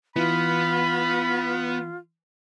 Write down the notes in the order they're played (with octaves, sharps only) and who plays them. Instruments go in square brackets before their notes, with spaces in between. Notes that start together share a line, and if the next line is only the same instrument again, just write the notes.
[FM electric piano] E3 [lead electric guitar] B3 [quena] F4 [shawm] B5